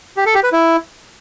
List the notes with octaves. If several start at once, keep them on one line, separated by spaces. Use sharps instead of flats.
G4
A4
G4
B4
E4